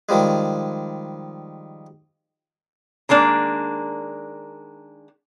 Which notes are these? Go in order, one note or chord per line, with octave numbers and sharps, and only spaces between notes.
D#3 F3 G3 G#3
D#3 G#3 A#3 D4